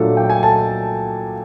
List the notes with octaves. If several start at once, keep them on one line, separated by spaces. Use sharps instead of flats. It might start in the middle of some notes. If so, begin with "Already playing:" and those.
Already playing: A#2 F#3 A3 D4 A4
G5
G#5
A4 A5